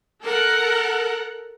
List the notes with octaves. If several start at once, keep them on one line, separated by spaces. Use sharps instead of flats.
A4 A#4 F#5